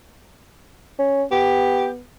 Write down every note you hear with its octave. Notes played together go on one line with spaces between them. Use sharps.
C#4
B3 G4